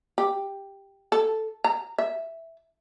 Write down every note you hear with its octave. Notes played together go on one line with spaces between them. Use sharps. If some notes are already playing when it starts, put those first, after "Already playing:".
G4
A4
A#5
E5